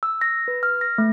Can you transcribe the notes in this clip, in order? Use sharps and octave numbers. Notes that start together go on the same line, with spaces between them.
E6
A#6
B4
F6
A#6
A3